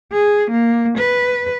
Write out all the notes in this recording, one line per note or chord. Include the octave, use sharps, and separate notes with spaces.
G#4
A#3
B4